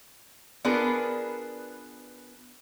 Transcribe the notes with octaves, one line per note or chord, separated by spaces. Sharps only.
B3 D4 F4 G#4 A#4 B4